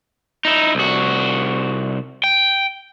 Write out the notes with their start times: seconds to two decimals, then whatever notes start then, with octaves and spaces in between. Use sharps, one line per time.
0.45 D#4 E4
0.75 C2 F#4
2.24 G5